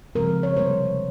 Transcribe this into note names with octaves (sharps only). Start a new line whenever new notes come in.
C#3 F3 G#3 C4 A#4
C#5
C3 G3 A#3 C5